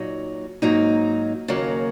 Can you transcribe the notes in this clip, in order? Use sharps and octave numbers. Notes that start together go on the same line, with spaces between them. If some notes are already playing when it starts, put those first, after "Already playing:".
Already playing: A#2 F#3 D#4
G#2 F#3 A#3 D#4
D#2 C#3 F#3 A#3